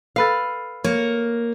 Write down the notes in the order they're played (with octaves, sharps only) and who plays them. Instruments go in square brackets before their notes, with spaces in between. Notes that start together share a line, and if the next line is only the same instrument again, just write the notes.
[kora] A4 B4 F5
[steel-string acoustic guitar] A#3 [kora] C#5